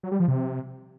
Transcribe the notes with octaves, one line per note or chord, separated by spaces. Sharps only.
F#3
G3
F3
C3